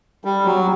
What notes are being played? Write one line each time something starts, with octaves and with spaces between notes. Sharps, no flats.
G3
F#3